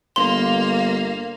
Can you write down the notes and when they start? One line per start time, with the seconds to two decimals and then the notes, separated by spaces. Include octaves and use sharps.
0.16 G1 A#3 F5 C6